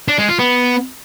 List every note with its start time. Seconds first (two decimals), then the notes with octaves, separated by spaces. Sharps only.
0.08 D4
0.18 G#3
0.29 F4
0.39 B3